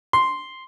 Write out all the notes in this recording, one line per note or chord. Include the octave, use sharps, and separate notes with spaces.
C6